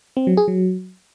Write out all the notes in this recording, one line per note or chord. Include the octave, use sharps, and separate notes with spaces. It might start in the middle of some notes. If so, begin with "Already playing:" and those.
C4
F#3
G#4
F#3